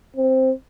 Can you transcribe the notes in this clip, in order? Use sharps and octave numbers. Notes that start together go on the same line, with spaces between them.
C4